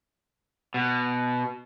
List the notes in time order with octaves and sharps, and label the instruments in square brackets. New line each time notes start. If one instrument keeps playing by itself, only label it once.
[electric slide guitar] B2